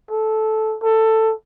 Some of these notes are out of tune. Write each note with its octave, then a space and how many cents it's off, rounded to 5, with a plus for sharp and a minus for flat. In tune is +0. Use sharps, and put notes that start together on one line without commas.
A4 -10
A4 +15